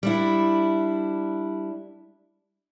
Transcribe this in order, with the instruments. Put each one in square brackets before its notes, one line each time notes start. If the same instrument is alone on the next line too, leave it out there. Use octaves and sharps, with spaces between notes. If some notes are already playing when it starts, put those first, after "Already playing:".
[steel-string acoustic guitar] G3 D4 E4